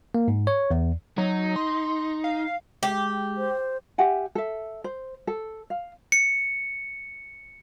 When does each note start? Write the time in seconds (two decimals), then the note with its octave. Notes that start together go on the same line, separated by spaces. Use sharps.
0.15 A#3
0.28 G#2
0.47 C#5
0.71 E2
1.18 F#3 D#4
1.56 C6
2.24 F5
2.83 G#3 G4
3.37 C5
3.98 G4 E5 F#5 G#5
4.35 A4 E5
4.84 C5
5.27 A4
5.70 F5
6.12 C#7